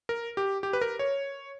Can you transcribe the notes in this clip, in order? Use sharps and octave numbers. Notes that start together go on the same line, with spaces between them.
A#4
G4
G4
B4
A#4
C#5